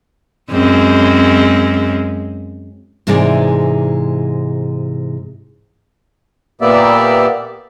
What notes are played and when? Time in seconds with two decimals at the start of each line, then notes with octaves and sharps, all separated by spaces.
0.51 F#2 G#3 C4
3.07 G#2 C3 E3 G#3 G#4 D5
6.61 A#2 A#3 B3 G4 D5 E5